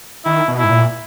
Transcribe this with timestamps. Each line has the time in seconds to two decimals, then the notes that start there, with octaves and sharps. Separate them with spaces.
0.25 D#3 E4
0.48 B2
0.59 G#2 E4
0.70 A#2